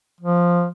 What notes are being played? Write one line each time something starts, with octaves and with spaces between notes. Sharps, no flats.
F3